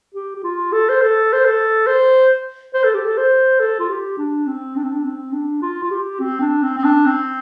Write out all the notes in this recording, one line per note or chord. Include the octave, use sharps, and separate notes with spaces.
G4
G4
F4
A4
C5
A4
C5
A4
C5
C5
A4
G4
A4
C5
A4
F4
G4
D4
C4
D4
C4
D4
C4
D4
F4
F4
G4
C4
D4
C4
C4
D4
C4